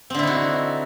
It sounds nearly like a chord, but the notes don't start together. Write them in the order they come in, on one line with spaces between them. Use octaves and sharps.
C4 D3 E4 D#4 F#4